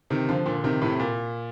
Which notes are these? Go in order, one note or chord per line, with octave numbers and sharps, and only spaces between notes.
C3 D#3
D3 F3
A#2 D3
C3 D#3
A2 C3
A#2